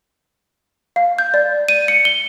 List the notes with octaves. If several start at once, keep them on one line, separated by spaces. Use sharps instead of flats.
F5
G6
D5
D#7
C#7
G7